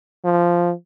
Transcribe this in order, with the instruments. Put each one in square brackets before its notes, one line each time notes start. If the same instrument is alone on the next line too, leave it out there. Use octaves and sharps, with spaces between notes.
[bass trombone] F3